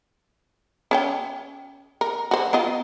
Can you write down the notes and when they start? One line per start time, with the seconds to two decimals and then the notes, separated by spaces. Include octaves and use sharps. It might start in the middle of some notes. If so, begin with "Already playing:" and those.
0.91 C#4 C#5 G5
2.01 A#4
2.31 F#4 C5
2.53 B3 F4 D#5